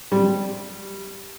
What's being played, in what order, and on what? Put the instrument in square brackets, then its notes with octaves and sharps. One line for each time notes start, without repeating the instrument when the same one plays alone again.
[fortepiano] G3